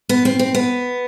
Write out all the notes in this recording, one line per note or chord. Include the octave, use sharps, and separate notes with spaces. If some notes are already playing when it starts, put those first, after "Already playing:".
B3
C4
C4
B3